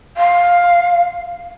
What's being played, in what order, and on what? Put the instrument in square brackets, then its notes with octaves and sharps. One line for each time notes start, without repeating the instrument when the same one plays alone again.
[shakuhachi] F5